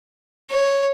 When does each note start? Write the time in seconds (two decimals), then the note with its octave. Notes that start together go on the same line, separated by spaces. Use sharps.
0.50 C#5